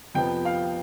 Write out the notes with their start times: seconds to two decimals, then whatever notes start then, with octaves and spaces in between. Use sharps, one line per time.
0.14 F2 C3 F3 B3 G5
0.45 F5